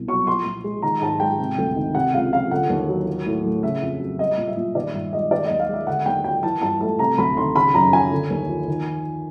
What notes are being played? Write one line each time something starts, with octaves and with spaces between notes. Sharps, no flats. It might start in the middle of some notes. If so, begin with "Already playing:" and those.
Already playing: C2 B2
F#3 C#6
F3 C6
A#2
G#3
D#3 A#5
G#2 A5
G#3 G5
C3
D2
D#3
C3 F#5
C#2 F5
F3 F5
D3 F#5
D#2
F#3
F#3
A2
A3
C#3 E5
F2
F#3
G3 D#5
A#2
E5
A#2
D#3 D5
G2 E5
G#3 D#5
D#3 D5
D#2 D#5
F5
G#3
E5
D3 F#5
D#2 G5
F#3 G5
E3 A5
G2 A5
A3 A5
C3 A#5
D2 B5
D#3 C6
C#3 B5
F#2 A#5
F3 G#5
D3
D#2
F3
D#3